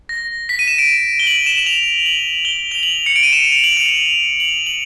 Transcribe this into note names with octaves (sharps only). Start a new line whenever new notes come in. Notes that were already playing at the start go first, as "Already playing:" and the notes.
A#6
B6
D#7
E7
D7
G7
F#7
E7
E7
F7
F#7
G7
F7
F#7
C#7
D7
D#7
E7
F7
F#7
F7
F#7
F#7
F#7